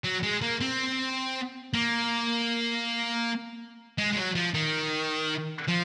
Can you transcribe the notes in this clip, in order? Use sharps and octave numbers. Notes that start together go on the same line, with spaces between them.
F#3
G#3
A#3
C4
A#3
G#3
G#3
F#3
F3
D#3
F3